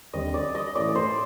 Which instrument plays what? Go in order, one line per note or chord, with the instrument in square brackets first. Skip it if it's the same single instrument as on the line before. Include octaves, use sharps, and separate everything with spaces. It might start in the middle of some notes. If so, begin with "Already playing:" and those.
[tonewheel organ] D#2 D3 G3 C4 [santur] D#5
[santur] D5
D#5
[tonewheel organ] A2 E3 A3 C#4 [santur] D5
[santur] C5